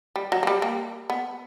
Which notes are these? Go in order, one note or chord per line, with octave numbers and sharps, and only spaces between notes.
G3
F#3
A#3
G3
A#3
B3